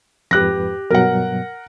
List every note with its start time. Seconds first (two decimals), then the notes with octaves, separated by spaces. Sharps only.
0.31 F2 G#2 G4 B4 F#6 A#6
0.90 G2 B2 F#3 A#4 F#5